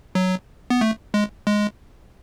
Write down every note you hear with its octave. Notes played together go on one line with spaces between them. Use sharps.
F#3
B3
A3
G#3
G#3